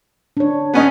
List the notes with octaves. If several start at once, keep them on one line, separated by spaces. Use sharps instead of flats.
D4 C#5
B3 C#4 D#4